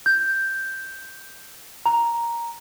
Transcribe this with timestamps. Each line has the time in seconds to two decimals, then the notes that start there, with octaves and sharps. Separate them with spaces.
0.06 G6
1.86 A#5